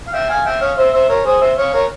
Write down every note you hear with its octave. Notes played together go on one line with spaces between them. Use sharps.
F5
E5 G5
F5 G#5
E5 G5
C#5 F5
C5 E5
C5 E5
A#4 C#5
G#4 C5
C5 E5
C#5 F5
A#4 C#5